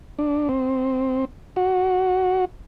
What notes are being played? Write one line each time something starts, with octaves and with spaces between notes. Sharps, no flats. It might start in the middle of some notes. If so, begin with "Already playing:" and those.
D4
C4
F#4